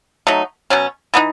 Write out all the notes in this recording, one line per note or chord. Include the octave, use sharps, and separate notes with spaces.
F#3 A3 D#4
B2 F#3 C#4
E3 B3 D#4